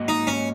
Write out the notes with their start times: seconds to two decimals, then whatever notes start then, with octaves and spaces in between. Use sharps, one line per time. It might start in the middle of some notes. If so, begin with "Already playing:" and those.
Already playing: G#2 F#3 A#3 F#4 D#5
0.08 D#4
0.27 C#4